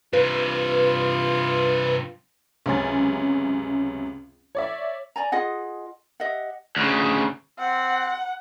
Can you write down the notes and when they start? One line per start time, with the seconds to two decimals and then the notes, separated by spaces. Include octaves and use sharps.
0.13 G2 C3 F4 B4
2.66 C#2 F#2 C3 C#4 G#5 A6
4.55 C#5 D5 E5
5.16 D5 G#5 A#5
5.32 F4 G#4 D#5 F#5
6.20 G4 D#5 E5 F#5
6.76 D2 C#3
7.59 C4 F#5